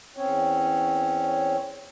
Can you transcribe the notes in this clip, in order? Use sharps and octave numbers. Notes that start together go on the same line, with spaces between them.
E2 C4 C#4 C#5